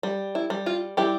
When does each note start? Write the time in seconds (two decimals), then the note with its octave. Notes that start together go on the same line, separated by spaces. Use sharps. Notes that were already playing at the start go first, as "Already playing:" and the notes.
0.03 G3
0.35 E4
0.50 G3
0.66 F4
0.97 G3 E4 G4